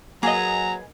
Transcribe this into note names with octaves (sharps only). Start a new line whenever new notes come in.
F#3 A#3 G#4 B4 D#5 A#5